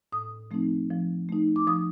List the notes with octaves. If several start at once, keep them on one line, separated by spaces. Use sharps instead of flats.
A2 D#6
F3 A3 C4 D#4
F3
A3 D#4
D6
F3 D#6